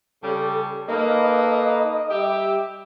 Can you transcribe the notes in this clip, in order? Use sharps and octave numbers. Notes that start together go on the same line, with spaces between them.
C#3 G3 A4
A#3 D#4 A4 B4 D#5
G3 G4 E5